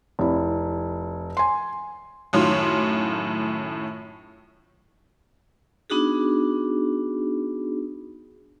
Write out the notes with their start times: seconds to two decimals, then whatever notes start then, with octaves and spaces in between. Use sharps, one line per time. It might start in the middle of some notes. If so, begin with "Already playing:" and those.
0.19 F1 E4
1.37 G#5 C6
2.33 F#2 A2 D#3 F4 C#5 C6
5.90 B3 D4 D#4 F#4 G#4